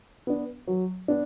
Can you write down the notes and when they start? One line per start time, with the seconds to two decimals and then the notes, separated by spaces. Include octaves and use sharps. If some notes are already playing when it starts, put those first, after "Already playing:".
0.27 B3 D4
0.67 F#3
1.08 B3 D4